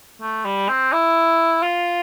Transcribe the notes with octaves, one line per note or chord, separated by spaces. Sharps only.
A3
G3
C4
E4
F4